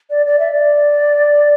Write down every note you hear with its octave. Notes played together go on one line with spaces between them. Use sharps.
D5
D5
E5
D5